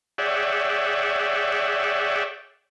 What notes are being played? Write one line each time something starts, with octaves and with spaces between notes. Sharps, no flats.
G#4 C#5 D5 E5 F#5 G5